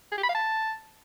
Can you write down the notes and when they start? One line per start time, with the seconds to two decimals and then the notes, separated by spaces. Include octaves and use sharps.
0.12 G#4
0.18 G4
0.23 B5
0.29 F5
0.35 A5